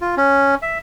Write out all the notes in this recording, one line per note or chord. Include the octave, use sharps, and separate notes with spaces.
F4
C#4
E5